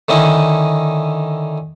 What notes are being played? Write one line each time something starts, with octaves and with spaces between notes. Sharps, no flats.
D3 D#3 C#4 D#4 E4